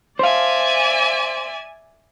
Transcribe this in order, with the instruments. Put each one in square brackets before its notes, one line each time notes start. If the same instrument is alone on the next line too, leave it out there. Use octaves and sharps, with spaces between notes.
[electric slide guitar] C5 F5 [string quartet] D5 E5 G#5